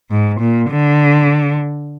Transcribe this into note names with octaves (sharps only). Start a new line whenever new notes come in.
G#2
A#2
D3